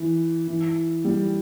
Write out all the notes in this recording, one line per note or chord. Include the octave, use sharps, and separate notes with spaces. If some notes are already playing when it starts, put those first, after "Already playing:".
Already playing: E3
E3
G3